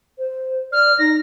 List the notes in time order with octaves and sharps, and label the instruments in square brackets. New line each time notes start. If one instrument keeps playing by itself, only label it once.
[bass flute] C5
[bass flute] D5 [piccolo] F6
[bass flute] D#4 [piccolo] A#6